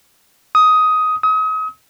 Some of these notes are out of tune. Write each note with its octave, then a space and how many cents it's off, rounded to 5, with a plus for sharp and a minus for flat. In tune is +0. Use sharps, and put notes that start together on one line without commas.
D#6 +10
D#6 +35